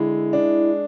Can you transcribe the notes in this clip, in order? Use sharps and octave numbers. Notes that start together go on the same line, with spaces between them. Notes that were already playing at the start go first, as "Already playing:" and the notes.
Already playing: D3 G#3 E4
D4